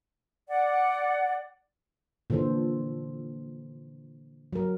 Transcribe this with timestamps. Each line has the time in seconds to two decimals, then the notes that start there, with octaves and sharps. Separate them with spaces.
0.48 D5 F#5
2.30 A#2 D3 E3 A4 C5
4.53 F#3 A#4